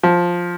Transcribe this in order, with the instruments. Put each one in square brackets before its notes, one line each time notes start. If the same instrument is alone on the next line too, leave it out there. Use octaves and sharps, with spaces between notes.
[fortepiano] F3